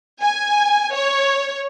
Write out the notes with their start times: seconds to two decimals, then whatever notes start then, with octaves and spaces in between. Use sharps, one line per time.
0.21 G#5
0.94 C#5